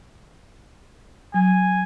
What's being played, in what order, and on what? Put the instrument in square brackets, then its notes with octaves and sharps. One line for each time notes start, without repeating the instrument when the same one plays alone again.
[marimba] F#3 [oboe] G#5